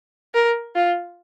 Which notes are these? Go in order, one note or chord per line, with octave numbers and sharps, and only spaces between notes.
A#4
F4